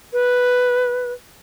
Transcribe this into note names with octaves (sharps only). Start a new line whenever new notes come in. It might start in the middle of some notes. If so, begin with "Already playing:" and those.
B4